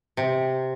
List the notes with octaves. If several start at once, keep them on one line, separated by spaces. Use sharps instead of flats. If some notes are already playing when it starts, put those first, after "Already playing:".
C3